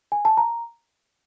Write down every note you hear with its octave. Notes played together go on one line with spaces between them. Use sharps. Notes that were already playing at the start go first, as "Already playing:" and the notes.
G#5
A5
A#5